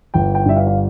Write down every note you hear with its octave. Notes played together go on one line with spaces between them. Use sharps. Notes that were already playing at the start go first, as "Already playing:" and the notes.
G1 G5
G5
G2 E5
F5
F5